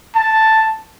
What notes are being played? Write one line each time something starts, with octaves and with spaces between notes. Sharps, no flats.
A5